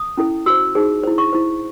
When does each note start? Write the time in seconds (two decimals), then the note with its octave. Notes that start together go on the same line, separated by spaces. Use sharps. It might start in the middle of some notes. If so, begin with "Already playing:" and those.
Already playing: D#6
0.17 C#4 E4 A4
0.46 F#4 C5 E6
0.75 D#4 G#4 C5
1.04 E4 C5
1.18 C#6
1.33 E4 C5